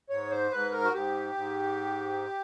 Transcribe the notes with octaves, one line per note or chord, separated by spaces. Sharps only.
G#2 C#5
C5
G#2 B4
A#4
F#4
G#2 G4
G#2